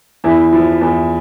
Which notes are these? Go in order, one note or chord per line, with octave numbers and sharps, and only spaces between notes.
E2 E4
F3
E2